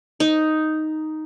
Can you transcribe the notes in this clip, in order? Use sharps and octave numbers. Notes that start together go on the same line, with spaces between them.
D#4